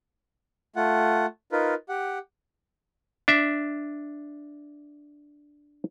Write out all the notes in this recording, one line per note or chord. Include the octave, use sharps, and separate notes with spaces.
A3 F4 F#5
D#4 F4 A#4 B4
G4 F#5
D4 E5